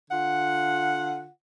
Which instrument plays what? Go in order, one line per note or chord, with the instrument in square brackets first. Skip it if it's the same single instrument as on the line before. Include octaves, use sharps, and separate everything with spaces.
[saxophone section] D3 F4 F#5